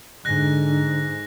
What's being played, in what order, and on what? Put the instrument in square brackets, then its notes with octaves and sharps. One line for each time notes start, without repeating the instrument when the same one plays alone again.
[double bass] G#2 [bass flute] D3 [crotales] F#6 A#6